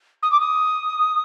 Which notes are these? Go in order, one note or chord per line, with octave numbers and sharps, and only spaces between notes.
D#6
D6
D#6